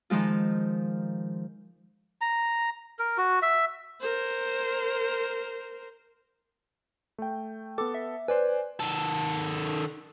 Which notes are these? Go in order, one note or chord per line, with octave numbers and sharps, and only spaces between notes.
D#3 F3 G#3 F4
A#5
A#4
F#4
E5
A#4 C5
A3 G5
B3 A4 D6
E5
B4 C5 D5 G#5
D#3 A4